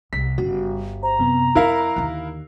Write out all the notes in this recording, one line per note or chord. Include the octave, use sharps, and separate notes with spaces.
C2 B6
G1 C#3 G3 F#4
C5 A#5
F#2 C3 B3
F2 E4 A#4 F5 F#6
D#2 D3